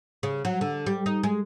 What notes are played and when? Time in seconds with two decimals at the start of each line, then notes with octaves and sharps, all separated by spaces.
0.23 C#3
0.45 F#3
0.61 D3
0.86 G3
1.06 D#4
1.23 G#3